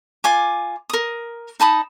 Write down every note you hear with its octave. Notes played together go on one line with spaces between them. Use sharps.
F4 G#5 D6
A#4 D#6
D#4 A5 B5 D#6